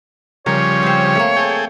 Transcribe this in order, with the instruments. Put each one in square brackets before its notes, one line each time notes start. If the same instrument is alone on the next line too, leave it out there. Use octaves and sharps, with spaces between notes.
[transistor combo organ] C#3 F3 G3 [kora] A#4 [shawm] C#5
[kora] C4 C5
A3 A#3
[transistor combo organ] G#4 A4 G5